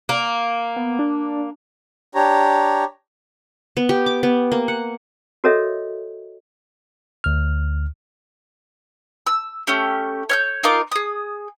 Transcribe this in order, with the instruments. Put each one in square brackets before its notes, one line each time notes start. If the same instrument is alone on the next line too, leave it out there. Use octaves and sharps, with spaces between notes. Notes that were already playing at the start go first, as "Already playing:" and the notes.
[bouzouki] A#3
[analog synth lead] B3
D4
[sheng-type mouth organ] D4 G4 C#5 A#5
[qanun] B3
G4
D6
B3
A#3
F#5
[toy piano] F#4 A4 A#4 C#5 D#5 E5
[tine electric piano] D2 F6
[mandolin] E6
A3 C#4 G4
C#5 F6 G6
D#4 F4 A#4 D6
G#4 D#6